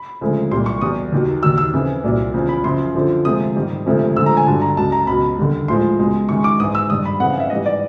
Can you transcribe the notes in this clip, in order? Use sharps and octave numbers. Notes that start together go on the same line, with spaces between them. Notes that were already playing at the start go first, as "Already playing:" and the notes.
Already playing: B5
D2 C#3 F3 G#3
C2 A#2 G3 C6
C#6
E2 B2 G3 D#6
D#2 D#3 F#3
D#2 D#3 F#3 E6
E6
F2 C#3 E3
C2 A#2 F#3
E2 C#3 F3
B5
F#2 C#3 F3 C6
F#2 D3 F3
D2 C3 F3 G#3 D#6
G#2 D#3 G3
D2 C3 F3 G#3
D2 D3 F3 G#3 E6
A#5
G#5
G2 D3 F#3 A5
A#5
C#2 C#3 F#3 A5
A#5
C#2 B2 F#3 B5
D#2 D3 G3
A2 F3 G#3 C6
C#2 B2 G#3
F#2 D#3 G#3 C#6
D6
G#2 E3 G#3 D#6
E6
G2 D#3 G3 D#6
B5
F2 C#3 E3 F#5
F5
E5
G#2 E3 G3 D#5
D5